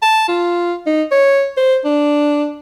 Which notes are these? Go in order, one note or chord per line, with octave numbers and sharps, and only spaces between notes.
A5
F4
D#4
C#5
C5
D4